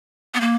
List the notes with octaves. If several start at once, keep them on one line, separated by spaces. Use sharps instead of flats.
B3
A#3